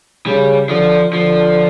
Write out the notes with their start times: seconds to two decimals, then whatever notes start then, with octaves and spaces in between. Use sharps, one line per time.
0.26 C#3 G3
0.69 D3 F3
1.12 D3 F3